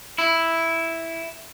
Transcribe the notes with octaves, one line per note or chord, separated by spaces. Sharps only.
E4